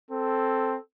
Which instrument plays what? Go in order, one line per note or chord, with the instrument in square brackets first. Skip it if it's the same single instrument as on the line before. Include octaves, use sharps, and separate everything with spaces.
[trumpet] C4 [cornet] A4